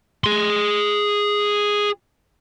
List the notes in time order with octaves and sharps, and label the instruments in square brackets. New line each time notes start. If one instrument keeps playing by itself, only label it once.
[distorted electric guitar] G#4 C6